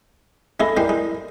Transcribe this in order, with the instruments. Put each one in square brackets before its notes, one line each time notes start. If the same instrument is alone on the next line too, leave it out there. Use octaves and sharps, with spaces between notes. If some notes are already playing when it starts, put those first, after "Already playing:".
[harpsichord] G#3 E4 F4 [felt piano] A4 B5 A#6
[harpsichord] G3 G#3 C5 [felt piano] E4 A#4 D5
[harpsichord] G#3